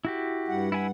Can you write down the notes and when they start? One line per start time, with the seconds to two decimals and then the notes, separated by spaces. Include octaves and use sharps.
0.05 E4 F#4 G4
0.48 G2 G3 F#5
0.72 E4 G#5 B5